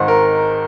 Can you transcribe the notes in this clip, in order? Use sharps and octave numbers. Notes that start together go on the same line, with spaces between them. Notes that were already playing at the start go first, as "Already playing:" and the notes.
Already playing: G#1 G#2 D#3 C5
A#4